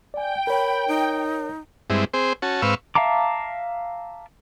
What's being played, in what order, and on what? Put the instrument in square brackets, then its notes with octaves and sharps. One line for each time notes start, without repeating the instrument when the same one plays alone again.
[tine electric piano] D5 G#5 [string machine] G5
[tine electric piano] A#4 C#5 [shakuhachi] B5
[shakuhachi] D#4
[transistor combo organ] G2 G#3 C4 E4
C4 G#4 C5
C#4 F#4 A5
G#2 C4 B4 F5 C#6 E6
[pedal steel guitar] E5 F5 A5 A#5 D6